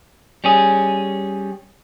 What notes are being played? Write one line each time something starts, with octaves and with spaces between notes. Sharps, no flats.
G3 C#4 G#4